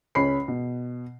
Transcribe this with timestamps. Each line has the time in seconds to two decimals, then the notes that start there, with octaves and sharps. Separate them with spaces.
0.15 C#2 C#4 C#5 B5 C7
0.48 B2